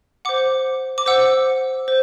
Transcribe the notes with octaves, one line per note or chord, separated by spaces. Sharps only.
C5 F#5 D6
D6
C5 F#5 E6
C5